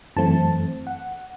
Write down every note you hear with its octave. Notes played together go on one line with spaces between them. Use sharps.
F#2 E3 A3 C4 A5
F#5